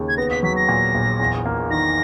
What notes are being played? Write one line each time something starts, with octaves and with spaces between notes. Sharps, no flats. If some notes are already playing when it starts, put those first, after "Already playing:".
Already playing: D#2 C#3
G#6
B3 A#6
B6
F#3 B6
A#6
A#2
A#1
E2
A#3
D#3 A#6